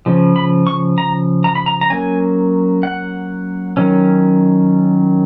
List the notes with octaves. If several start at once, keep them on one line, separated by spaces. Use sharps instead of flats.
C#3 F3
B5
C#6
A#5
A#5
B5
A#5
A#5
F#3 A#3 C#4 G#5
F#5
D#3 F#3 C#4